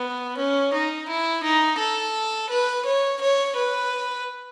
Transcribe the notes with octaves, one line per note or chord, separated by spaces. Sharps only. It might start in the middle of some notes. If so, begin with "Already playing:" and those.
Already playing: B3
C#4
D#4
E4
D#4
A4
B4
C#5
C#5
B4